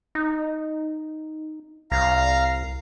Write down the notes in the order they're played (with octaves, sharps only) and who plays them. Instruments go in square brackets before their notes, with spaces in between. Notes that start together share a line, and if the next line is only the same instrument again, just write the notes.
[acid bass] D#4
[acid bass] C2 [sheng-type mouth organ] F5 A#5